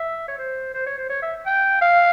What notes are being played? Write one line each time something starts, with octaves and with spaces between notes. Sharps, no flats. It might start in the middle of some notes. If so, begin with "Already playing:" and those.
Already playing: E5
C#5
C5
C5
C#5
C5
C#5
E5
G5
F5